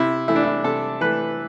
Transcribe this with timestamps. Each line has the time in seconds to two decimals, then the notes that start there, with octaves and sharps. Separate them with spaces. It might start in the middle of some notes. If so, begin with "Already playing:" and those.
Already playing: C3 E4
0.28 E3 A3 E4
0.36 D4
0.43 E4
0.64 C3 A4
1.01 E3 A3 B4